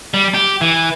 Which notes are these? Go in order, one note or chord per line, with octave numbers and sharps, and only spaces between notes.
G3
G4
E3